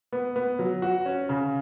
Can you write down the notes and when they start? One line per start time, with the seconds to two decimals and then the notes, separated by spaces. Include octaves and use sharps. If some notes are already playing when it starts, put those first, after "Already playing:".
0.13 B3
0.36 B3
0.59 F#3
0.82 F#4
1.06 C#4
1.29 C#3